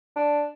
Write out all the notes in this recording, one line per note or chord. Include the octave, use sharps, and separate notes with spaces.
D4